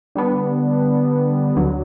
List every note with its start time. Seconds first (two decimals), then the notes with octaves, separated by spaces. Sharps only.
0.15 D3 G3 B3 D4
1.56 D2 D3 F#3